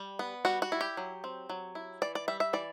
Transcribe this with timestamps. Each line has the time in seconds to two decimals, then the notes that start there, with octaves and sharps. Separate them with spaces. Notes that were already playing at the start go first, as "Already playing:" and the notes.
Already playing: G3
0.19 B3
0.45 G3 F#4
0.62 F#4
0.72 E4
0.81 G4
0.97 F#3
1.24 C4
1.50 F#3
1.75 E4
2.02 E3 D5
2.15 D5
2.28 G3 E5
2.40 E5
2.53 E3 D5